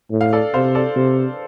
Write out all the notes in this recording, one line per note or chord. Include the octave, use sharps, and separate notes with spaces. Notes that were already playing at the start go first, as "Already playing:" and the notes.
A2
F5
A4 D5
C3 C5 F5
A4 D5
C3